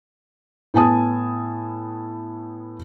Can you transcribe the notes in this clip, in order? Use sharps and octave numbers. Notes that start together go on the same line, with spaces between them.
A2 B3 G#5 A5 D#6